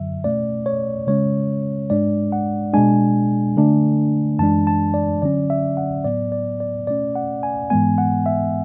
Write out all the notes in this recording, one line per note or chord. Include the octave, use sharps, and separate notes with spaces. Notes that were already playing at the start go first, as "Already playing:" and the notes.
Already playing: F#2 D3 F#3 E5
B2 A3 C#4 D5
C#5
C#3 G#3 C#4 C#5
G#2 G#3 D4 D5
F#5
B2 G#3 D4 G#5
D3 A3 D4
F#2 E3 G#3 D4 A5
A5
D5
D3 F#3 C#4 D5
E5
F#5
A2 F#3 B3 D5
D5
D5
B2 A3 C#4 D5
F#5
G#5
G#2 E3 G#3 B3 G#5
F#5
E5